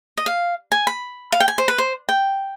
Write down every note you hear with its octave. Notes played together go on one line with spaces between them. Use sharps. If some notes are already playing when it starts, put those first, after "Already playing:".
D#5
F5
G#5
B5
F5
G5
G#5
C5
B4
C5
G5